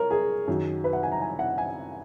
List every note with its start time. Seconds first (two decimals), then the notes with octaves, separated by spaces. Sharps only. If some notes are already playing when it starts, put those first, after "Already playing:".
Already playing: A#4 C#5
0.10 G#4
0.48 F#2 D#3 F#3
0.84 B4
0.93 F#5
1.03 G#5
1.12 A#5
1.21 G#5
1.39 F#5
1.58 G#5